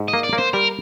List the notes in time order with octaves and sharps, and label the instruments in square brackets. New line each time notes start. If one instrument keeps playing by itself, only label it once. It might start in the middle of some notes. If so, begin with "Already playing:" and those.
Already playing: [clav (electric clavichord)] G#2
[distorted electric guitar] D#5
[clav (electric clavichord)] A#3
[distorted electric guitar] D5
[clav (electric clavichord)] A#3
[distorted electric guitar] C5
[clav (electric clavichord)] G3 [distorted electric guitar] A#4